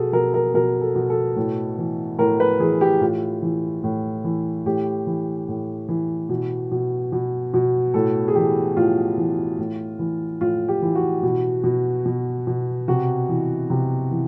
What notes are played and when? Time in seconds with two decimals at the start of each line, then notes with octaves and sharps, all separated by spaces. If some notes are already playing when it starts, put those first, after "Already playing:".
Already playing: B2 G#4 A4
0.13 B2 A#4
0.34 A#4
0.54 B2 A#4
0.81 A4
0.95 B2
1.10 A4
1.36 A2
1.78 E3
2.18 A2 A#4
2.40 B4
2.60 E3 G#4
2.81 G4
3.01 A2 F4
3.42 E3
3.83 A2
4.24 E3
4.66 A2 G4
5.07 E3
5.48 A2
5.89 E3
6.29 B2
6.71 B2
7.12 B2
7.54 B2
7.94 A2 A4
8.28 G#4
8.35 E3 G4
8.76 A2 F4
9.18 E3
9.59 A2
9.99 E3
10.41 A2 F4
10.68 G4
10.82 E3
10.95 F#4
11.23 B2
11.64 B2
12.06 B2
12.47 B2
12.88 C3 F#4
13.29 E3
13.70 C3
14.11 E3